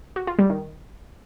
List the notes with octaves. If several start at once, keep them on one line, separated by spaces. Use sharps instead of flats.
F#4
F4
G3
D#3